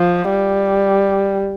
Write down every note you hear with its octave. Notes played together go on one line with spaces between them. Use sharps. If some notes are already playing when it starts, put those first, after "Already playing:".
Already playing: F3
G3